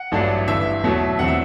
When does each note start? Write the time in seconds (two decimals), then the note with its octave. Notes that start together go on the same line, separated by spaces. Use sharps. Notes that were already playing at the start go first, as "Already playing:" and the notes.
Already playing: F#5
0.12 A1 G2 F#3 A3 D4
0.47 G1 G2 E3 E5
0.84 E2 B2 F#3 A3
1.19 E2 D3 F#3 C4 F#5
1.28 E5